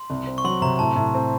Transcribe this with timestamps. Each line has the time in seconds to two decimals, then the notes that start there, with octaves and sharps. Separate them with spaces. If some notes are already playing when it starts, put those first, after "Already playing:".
Already playing: C6
0.10 C2
0.27 C4
0.38 C#6
0.44 F#3 C6
0.62 C3 A#5
0.79 A2 A5
0.96 A2
1.14 C4